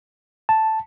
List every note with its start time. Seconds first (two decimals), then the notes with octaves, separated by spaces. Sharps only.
0.49 A5